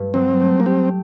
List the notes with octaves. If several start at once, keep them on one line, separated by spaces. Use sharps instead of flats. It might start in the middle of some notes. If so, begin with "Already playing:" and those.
Already playing: G2 A3
F#3 C4
A3
A#3
C4 G4